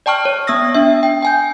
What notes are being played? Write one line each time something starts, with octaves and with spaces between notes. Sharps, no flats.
D5 G5 A5 C#6 F6
C#5
B3 D#6 E6 A#6
D4 E5
G5
G5 G#5 G6